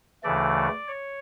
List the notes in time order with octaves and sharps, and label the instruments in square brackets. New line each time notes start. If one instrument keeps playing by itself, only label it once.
[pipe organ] D2 C#3 E3 A3 D5
C#5